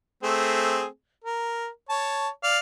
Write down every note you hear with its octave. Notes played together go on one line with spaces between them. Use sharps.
A3 C4 G#4
A#4
C#5 A5
D5 F5